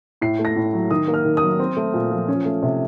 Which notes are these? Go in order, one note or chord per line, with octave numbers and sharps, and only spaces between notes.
A2 C7
A3
A#6
A2
F#3
D#3 D#6
A#3
F6
D#3
D#6
F#3
C4
A3
A#2
F3
C#4
A3
C3